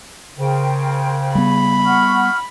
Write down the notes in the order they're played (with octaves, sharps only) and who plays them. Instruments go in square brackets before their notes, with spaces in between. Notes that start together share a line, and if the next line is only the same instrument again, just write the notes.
[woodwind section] C#3 [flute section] A#4 C5 G5
[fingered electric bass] G3 B3 [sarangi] B5
[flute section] F#5 C#6 F6